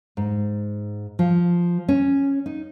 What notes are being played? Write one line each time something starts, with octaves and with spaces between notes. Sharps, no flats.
G#2
F3
C#4
D#4